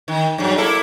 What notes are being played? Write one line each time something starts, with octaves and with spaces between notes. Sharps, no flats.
D#3
G2 F#3
A#3 E4 A4